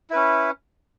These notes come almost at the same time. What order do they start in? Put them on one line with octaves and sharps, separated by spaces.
E4 B4 C#4